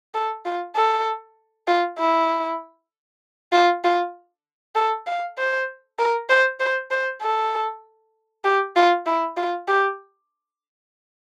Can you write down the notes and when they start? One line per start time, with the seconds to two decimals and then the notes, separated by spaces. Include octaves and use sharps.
0.14 A4
0.45 F4
0.76 A4
1.68 F4
1.99 E4
3.52 F4
3.84 F4
4.75 A4
5.07 F5
5.38 C5
5.99 A#4
6.29 C5
6.60 C5
6.91 C5
7.22 A4
8.44 G4
8.76 F4
9.06 E4
9.37 F4
9.68 G4